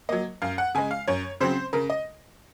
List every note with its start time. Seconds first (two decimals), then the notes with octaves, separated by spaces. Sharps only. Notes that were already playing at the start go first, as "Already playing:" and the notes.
0.09 F#3 A#3 D#5
0.42 F#2 F5
0.58 F#5
0.75 C#3 G#3 G#5
0.91 F5
1.08 F#2 C#5
1.41 C#3 F#3 C4 C5
1.73 C#3 A#4
1.90 D#5